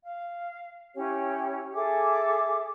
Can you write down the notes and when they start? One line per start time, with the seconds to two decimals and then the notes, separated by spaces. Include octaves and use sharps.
0.04 F5
0.95 C#4 E4 G4 C#5
1.73 G#4 A4 E5 D6